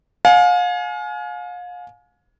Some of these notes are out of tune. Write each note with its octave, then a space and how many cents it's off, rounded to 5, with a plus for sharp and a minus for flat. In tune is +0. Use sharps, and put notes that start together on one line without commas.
F5 +35 G#5 +25